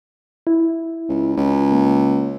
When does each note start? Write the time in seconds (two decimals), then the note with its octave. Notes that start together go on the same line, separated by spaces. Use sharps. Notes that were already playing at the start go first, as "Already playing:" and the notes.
0.47 E4
1.09 C#2
1.37 C#2
1.72 A#3